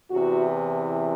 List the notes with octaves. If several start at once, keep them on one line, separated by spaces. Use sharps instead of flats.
E2 C3 E3 F#4